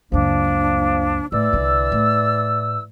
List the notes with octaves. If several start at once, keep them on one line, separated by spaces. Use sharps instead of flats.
C#2 F#2 F3 A#3 D4
A2 E3 D5 E6
C2 D3
A2